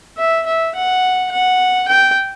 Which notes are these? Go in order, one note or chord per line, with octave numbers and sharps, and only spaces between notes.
E5
E5
F#5
F#5
G5